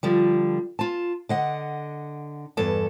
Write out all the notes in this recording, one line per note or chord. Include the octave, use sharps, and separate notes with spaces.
D3 F3 G3
F4 A5
D3 D#5 F#5
E2 G2 A4 A5